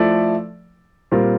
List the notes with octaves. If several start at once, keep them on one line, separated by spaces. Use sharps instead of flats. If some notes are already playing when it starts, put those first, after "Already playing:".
Already playing: F3 A3 E4 A4 D5
A#2 G3 C4 F4 A#4